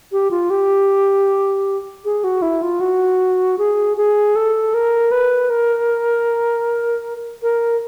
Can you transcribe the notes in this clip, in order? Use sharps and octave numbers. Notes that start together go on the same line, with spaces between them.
G4
F4
G4
G#4
F#4
E4
F4
F#4
G#4
G#4
A4
A#4
B4
A#4
A#4